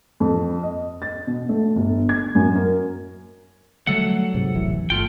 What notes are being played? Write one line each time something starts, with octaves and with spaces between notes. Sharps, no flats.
F2
D#5
A6
B2
A3
G1
G#6
F#2
A#4
D3 F#3 G3 A3 A4 F#5
G#2 C3
D1 A1 E3
G1 A3 F4 G5